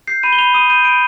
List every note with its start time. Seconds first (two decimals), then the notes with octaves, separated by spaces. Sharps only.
0.07 G6 C7
0.23 B5 D#7
0.33 G7
0.39 B5 F7
0.54 D#6 D#7
0.70 G6 D#7
0.85 B5 D7